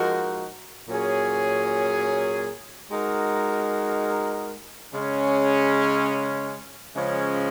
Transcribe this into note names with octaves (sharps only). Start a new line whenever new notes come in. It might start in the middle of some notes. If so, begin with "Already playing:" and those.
Already playing: F3 G#3 D#4 F#4 A#4
A#2 F#3 C#4 G#4
G#3 D#4 F#4 A#4
C#3 G#3 C#4
C#3 F3 G#3 C#4